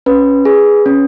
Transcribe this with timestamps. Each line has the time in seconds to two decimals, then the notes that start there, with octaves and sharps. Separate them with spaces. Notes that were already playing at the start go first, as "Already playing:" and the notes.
0.06 C#4 B4
0.45 G#4
0.86 C#4